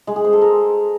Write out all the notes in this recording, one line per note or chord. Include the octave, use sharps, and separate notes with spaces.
G#3
G#4
C5
A4
A#4